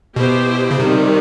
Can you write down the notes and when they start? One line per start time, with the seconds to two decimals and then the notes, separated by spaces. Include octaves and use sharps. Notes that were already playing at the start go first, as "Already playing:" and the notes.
0.16 B2 B3 E4 G4 C5
0.71 C#3
0.79 C3 D#3 G3 C4